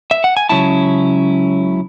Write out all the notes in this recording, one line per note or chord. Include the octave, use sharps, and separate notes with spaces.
E5
F#5
G#5
C#2 C#3 F#3 C#4 E4 A5